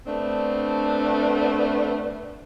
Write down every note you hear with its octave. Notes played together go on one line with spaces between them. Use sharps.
A3 B3 C4 D4